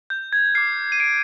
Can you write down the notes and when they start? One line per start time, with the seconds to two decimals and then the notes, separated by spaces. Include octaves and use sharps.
0.10 G6
0.33 G#6
0.55 D6 F6 C7
0.92 D#7
1.00 C7 D7